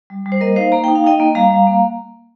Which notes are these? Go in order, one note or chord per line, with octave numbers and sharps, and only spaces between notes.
G3
G3
C5
A#3 A#4 D#5
D#4 C5 F5
A#3 A#5
D#4 G5
F5
D#4 D#5 G5
A#3
G3 F5 A#5
G3
A#3